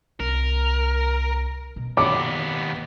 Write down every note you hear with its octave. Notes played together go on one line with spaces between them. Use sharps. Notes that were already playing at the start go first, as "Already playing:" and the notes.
C2 A#4
B2
D#2 B3 D6